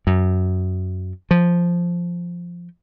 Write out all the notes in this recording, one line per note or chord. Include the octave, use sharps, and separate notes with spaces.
F#2
F3